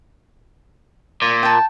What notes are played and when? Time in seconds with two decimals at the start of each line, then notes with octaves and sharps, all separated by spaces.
1.22 A#2
1.43 G5 A5